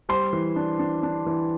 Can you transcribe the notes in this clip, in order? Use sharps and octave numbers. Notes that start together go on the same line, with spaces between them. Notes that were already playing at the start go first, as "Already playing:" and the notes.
G3 C5 C6
E3
D4
D4
D4
E3